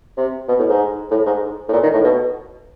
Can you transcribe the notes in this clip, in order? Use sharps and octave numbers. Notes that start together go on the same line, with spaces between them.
C3
B2
A2
G#2
A2
G#2
A2
A#2
D#3
A2
B2